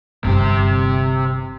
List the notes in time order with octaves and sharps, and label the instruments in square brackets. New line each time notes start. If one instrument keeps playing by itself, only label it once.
[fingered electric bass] G1 G2 [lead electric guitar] C3 G4